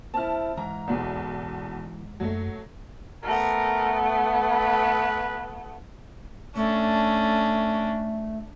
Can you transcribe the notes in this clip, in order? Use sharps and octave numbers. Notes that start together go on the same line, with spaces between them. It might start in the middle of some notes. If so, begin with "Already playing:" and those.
C4 E4 A5 F6
G#2 E3 A#5
B1 E2
F#2 F#3 A3
A3 B3 A#4
B4
A3 C#4 D4